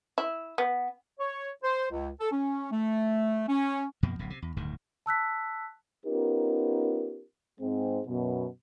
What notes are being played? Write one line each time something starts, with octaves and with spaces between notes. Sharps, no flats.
E4
B3
C#5
C5
C#2
A4
C#4
A3
C#4
F#2 B2 F3 A#3
D1 B1 A#2 C#3
C3
E2
D1 D2 G2 D#3
A5 E6 F#6 B6
B3 C#4 D#4 F4 G4 A#4
G#2 G#3 C4
F#2 B2